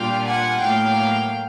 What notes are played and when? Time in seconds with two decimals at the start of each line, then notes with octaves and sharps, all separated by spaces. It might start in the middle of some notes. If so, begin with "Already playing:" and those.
Already playing: A#2 G3 A#3 D4 F4 F5 G5
0.26 F#5 G#5
0.61 A2 F#3 A#3 F5 G5